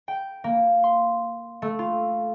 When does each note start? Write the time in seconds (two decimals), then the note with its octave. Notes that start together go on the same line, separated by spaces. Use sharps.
0.08 G5
0.44 A#3
0.84 C6
1.62 A3
1.79 F4